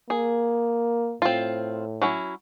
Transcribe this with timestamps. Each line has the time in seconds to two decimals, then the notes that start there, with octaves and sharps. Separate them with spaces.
0.10 A#3 G#4
1.22 A2 C4 F4
2.02 F#3 C#4 E4